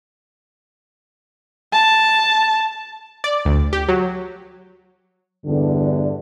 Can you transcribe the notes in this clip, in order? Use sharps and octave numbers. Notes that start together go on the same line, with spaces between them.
A5
D5
D2
G4
F#3
E2 G2 D3